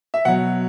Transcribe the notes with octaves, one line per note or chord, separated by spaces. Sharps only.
E5
B2 F#3 F#5